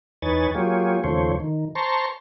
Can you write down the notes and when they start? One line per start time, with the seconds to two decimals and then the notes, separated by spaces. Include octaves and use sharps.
0.22 E2 D#4 B4 C#5 G#5 A6
0.55 F#3 A#3 F4 G4 G#4 C#5
1.04 D#2 C#3 F3 A3 C5 C#5
1.40 D#3
1.75 C5 A5 A#5 C6 C#6